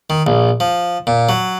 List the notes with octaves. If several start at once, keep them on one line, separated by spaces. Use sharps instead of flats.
D#3
A#1
F3
A#2
F#3